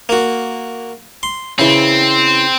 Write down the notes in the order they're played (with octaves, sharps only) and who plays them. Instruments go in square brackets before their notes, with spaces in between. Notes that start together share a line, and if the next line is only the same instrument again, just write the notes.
[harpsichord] A#3 F#4
C6
[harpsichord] C#3 E3 [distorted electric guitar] C4